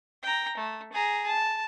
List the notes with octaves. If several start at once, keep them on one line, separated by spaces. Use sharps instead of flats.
G5 A#5
A3
G#4 A#5
A5